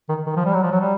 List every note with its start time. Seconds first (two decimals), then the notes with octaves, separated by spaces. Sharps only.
0.09 D#3
0.26 D#3
0.36 F3
0.45 G3
0.54 F#3
0.63 F3
0.72 F#3
0.80 G3